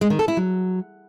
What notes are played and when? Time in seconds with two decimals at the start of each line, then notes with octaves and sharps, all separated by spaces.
0.01 G#3
0.10 D#3
0.19 A4
0.28 E4
0.37 F#3